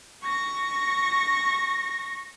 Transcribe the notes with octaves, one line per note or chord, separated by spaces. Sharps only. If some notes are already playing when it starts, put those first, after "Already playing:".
C#6 A#6